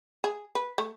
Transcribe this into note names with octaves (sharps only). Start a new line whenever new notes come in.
G#4
B4
A3